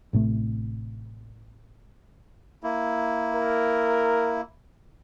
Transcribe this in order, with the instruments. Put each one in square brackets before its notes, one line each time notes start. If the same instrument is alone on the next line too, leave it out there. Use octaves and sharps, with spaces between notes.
[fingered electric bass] A1 A2 C3 A3
[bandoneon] A#3 E4
[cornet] A#4